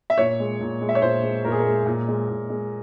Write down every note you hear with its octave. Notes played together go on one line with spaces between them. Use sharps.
E5
A#2 C#5
G#3
A#2
G#3
E5
C#5
A#2 C5
G#3
A#2 A#4
G#4
A#4
G#3
A#2
G#3
A#2
G#3